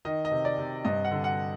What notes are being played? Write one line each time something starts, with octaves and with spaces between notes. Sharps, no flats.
D#3 D#5
D#5
C3
D5
C3
G2 D#5
F#5
D3
F#5